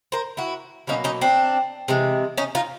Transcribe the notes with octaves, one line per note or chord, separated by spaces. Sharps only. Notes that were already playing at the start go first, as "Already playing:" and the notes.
A#4 C5
E4 F#4
B2 F#3 A#3 C#4 D#4
C#4 D#4
C4 D4
C3 E3 G#3
C#4 D#4
D#4 F4